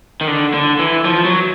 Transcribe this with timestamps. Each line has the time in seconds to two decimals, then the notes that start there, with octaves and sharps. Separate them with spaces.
0.21 D#3
0.28 D3
0.54 D3
0.79 E3
1.05 F3
1.25 F#3